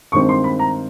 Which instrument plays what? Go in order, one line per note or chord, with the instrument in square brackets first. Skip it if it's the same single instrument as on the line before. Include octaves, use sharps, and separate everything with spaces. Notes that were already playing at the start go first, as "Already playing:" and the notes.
[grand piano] G2 D#3 G#3 C4 C#6
C6
B5
A#5